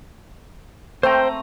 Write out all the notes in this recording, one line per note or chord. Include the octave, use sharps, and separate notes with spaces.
A3 C4 C5 G5 A#5